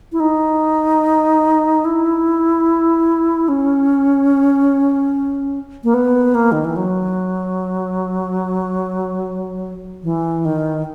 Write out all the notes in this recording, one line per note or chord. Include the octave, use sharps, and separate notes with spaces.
E4
D#4
E4
C#4
A#3
B3
A#3
D#3
E3
F#3
E3
D#3